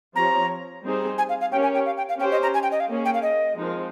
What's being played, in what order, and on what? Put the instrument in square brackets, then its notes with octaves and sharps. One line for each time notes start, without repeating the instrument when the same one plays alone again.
[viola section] F3 C4 G4 C#5 [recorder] A#5
[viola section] G3 C4 D#4 G#4 C5
[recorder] G#5
F5
F5
[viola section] C#4 G4 A#4 C#5 [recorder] G5
[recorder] G#5
G5
F5
G5
F5
[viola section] C#4 G4 C5 [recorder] G5
[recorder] D#5
A#5
G#5
G5
D#5
F5
[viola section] A#3 C#4 G#4
[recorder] G5
F5
D#5
[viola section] F3 G#3 C4 D#4 A#4